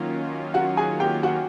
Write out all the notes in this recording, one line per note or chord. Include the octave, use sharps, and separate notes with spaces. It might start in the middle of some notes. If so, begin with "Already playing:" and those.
Already playing: D#3 F#3 A#3 C#4 F4
F#4 F#5
G#4 G#5
G4 G5
F#4 F#5